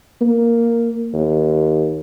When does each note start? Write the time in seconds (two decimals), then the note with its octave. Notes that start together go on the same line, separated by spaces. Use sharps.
0.21 A#3
1.14 D#2